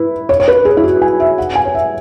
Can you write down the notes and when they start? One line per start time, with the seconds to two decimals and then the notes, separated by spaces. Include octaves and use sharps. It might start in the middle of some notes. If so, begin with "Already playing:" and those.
Already playing: E4 B4
0.29 C#5
0.40 C#5
0.48 B4
0.65 G#4
0.77 E4
0.84 F#4
1.02 G#5
1.20 E5
1.38 F#5
1.55 G#5
1.65 C#5
1.75 E5